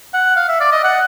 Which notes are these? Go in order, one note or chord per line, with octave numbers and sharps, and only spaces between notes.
F#5
F5
E5
D5
D#5
F#5